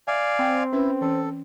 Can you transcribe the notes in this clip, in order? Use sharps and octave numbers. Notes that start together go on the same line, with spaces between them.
D5 E5 F5 G#5
C4
C#4 E4 B4 B5
E3 C#4 A4